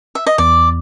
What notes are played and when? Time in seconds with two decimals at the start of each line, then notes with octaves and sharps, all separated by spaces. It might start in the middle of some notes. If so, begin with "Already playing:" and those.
0.15 E5
0.27 D#5
0.38 E2 D5